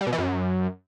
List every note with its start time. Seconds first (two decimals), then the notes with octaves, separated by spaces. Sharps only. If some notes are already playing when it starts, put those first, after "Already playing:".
0.01 G3
0.07 B2
0.13 E3
0.18 F#2